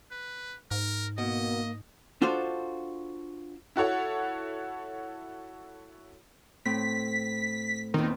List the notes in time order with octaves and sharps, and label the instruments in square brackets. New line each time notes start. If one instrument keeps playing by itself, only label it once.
[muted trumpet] B4
[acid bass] G#2 [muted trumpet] A#4
[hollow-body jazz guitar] B2 [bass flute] A#3 [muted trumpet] D#5
[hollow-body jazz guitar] D4 F4 F#4 A4 C5
[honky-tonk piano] E4 F#4 A4 C#5 F#5
[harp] A2 C4 [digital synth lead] B6
[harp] E2 A#2 C4 [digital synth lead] D#3